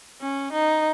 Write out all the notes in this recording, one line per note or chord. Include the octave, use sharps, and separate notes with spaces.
C#4
D#4